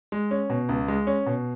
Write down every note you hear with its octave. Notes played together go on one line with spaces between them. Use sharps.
G#3
C#4
B2
C#2
G#3
C#4
B2